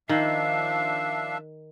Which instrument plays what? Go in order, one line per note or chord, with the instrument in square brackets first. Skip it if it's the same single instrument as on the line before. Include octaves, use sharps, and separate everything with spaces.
[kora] D#3 [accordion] F3 D4 E5 [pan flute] F5